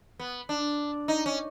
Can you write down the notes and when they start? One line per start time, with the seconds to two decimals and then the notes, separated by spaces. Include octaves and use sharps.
0.19 B3
0.49 D4
1.08 D#4
1.26 C#4